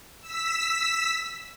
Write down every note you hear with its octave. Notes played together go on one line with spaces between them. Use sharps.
E6 B6